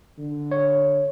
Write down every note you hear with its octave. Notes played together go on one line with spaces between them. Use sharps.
D3
C#5